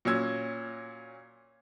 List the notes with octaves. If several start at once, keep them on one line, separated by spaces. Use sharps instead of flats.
A#2 F#3 C#4 E6 G#6